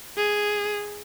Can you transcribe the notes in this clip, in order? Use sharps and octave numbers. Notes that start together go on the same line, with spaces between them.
G#4